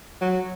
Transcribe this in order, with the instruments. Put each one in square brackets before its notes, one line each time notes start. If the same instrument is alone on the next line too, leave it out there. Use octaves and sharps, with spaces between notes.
[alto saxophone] F#3